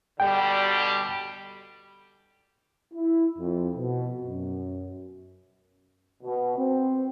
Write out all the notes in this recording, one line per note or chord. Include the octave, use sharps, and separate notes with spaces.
B2 D3 G3 G5
E4
F2
B2
F#2
B2
C4